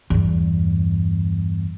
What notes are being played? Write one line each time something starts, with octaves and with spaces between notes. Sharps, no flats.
E2 G2